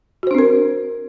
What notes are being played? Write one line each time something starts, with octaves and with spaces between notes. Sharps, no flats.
C4 D4 F#4 A#4 C5